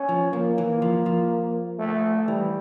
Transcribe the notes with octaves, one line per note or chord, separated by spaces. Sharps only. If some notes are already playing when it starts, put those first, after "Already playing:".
Already playing: C#4
F3
F3 A#3
E3
F3
F3
A3
E3 G3